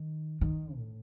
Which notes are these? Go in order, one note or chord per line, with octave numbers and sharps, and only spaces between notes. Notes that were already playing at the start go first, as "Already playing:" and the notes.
Already playing: D#3
D#3
A2